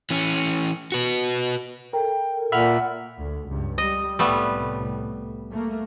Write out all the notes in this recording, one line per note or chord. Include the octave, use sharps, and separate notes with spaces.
E3 C#4
F#4 B4
A4 A#4 G5
A#2 E5 F#5 B5 F6
D2
C#2 G2
G3 D#5
C2 A2 G3 A3 B3
A3 A#3